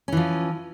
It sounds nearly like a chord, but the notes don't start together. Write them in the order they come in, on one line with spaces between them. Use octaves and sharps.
C#4 E3 F3